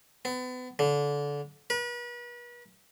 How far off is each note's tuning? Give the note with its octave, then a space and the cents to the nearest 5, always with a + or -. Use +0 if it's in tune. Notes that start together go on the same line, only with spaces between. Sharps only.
B3 +35
D3 -25
B4 -40